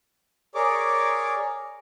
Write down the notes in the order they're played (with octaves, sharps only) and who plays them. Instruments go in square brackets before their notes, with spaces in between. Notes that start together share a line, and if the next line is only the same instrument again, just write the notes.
[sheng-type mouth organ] G#4 A#4 C#5 D5 D6